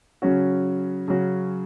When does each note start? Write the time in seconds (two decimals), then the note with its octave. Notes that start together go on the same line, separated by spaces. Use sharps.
0.22 C#3 F#3 C#4 F#4
1.08 C#3 F#3 C#4 F#4